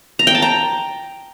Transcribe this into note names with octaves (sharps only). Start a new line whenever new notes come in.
A#5
G5
A5
A#5